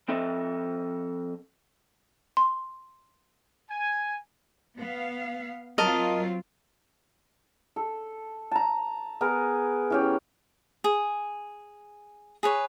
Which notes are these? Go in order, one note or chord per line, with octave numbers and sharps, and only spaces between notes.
F3 C4 A4 D#5 E5
C6
G#5
B3 F5
F#3 C4 F4 A#4 D#5 A5
A4
A5 A#5
B3 G#4 A#4
E3 C#4 G4
G#4
G#4 B4 C#5